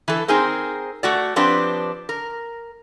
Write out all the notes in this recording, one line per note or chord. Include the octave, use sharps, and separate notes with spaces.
E3 A4
C4 D#4 G#4 A#4 C5
A3 F#4 D5
F3 C4 D4 G4 B4
A#4